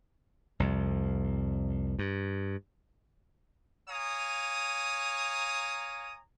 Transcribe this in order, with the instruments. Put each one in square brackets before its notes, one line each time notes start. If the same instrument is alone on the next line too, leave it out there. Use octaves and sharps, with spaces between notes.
[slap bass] C2 F2
G2
[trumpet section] C#5 F5 G#5 A#5 D#6